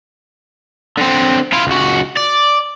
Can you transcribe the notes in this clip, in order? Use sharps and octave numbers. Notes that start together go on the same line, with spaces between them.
D3 C4
E4 F4
C#2 F#4
D5